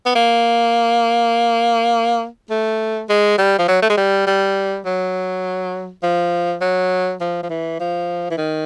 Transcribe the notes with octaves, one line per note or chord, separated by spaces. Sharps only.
B3
A#3
A3
G#3
G3
F3
F#3
A3
G#3
G3
G3
F#3
F3
F#3
F3
F3
E3
F3
E3
D#3